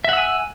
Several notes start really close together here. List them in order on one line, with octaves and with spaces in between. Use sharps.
E5 F#5 E6 G#5